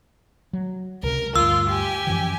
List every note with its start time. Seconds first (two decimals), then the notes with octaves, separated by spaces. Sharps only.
0.53 F#3
1.03 C#2 C3 A#4
1.36 D2 G2 F4 E6
1.69 G4 G#5
2.07 F#2 E3 F3